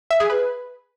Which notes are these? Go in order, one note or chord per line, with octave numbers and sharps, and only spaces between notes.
E5
G#4
B4